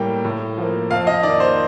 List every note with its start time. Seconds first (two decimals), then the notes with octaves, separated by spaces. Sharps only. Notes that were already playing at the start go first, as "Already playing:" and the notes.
Already playing: A2 G3 A#3 G5
0.25 A2
0.58 F3 A#3
0.90 F2 F5
1.07 D#5
1.23 D#3 A#3 D5
1.40 C5